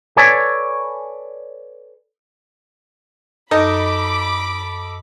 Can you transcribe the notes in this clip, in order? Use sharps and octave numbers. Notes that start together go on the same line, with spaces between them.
A4 B4 C#5 D5 G#5
F#2 D#4 A4 D#5 B5 D6